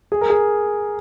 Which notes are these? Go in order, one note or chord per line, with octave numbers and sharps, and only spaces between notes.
G#4
A#4
G#4